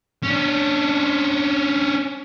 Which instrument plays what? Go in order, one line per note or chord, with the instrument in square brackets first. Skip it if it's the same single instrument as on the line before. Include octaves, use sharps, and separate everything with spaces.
[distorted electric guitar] C#4 D4